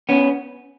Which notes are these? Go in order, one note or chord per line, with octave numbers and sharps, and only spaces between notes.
B3 C#4